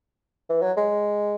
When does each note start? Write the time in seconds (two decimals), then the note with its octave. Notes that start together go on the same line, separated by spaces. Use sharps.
0.50 E3
0.62 F#3
0.77 G#3